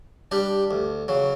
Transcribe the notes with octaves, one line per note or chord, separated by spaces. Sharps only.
G3 D4 G4
D2
C#3 F#3